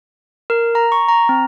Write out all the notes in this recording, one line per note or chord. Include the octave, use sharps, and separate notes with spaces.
A#4
A#5
C#6
A#5
C4